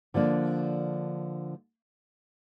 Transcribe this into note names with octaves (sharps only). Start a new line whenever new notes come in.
D3 F3 A#3 D4